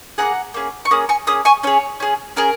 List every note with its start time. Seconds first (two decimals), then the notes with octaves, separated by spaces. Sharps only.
0.18 A#3 C#4 G#4 F#5 A#5
0.54 A#3 C#4 G#4
0.85 C#6
0.91 A#3 C#4 G#4 D#6
1.09 G#5 C#6
1.27 A#3 C#4 G#4 D#6
1.45 G#5 C#6
1.63 C#4 G#4 C#5
2.00 C#4 G#4
2.36 C#4 G#4 A#4